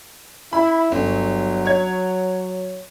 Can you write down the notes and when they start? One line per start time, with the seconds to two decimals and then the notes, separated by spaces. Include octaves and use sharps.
0.53 E4 B5
0.92 G1 F#3
1.65 C#5 G#6